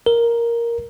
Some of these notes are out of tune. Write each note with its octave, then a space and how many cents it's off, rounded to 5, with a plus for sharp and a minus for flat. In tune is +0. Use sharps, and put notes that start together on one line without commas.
A#4 +5